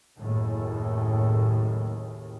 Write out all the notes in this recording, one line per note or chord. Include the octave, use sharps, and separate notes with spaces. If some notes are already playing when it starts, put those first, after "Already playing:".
F#1 D#2 A2 C#3